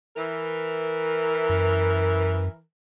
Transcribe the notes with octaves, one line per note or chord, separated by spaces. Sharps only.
E3 A#4
F#2